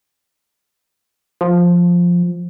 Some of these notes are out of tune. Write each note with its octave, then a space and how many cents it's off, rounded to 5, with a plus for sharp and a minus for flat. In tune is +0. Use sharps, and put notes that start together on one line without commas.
F3 +5